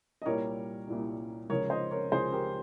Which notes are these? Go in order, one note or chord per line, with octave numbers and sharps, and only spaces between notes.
D#5
C2 A#2 G3 A#4 C#5
C2 A#2 G3
C#2 C#3 F3 A#4 C#5
C5 D#5
A#4 C#5
C#2 C#3 F3 G#4 C5
G4 A#4